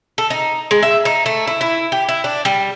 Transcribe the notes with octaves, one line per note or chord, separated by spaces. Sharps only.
A4
D#4
G#3
E5
D#4
A3
E4
E4
G4
E4
D4
G3